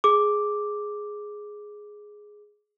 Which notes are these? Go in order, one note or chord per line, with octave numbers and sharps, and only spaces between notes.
G#4 D6